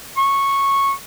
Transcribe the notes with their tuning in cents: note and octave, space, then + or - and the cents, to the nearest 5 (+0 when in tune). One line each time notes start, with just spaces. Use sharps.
C#6 -10